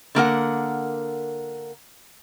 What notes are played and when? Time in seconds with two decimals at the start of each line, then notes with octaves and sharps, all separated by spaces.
0.15 D3 A#3 A#4 F#5